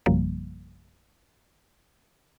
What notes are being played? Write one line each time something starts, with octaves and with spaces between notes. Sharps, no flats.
A#1 F#2 C#3 F3 G3 A#3